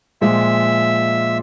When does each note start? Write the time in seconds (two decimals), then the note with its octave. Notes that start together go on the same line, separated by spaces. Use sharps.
0.21 A#2 F3 G#3 E5